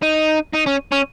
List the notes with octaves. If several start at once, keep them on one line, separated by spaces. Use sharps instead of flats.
D#4
D#4
C#4
C#4